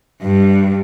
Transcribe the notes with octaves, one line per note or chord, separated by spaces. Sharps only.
G2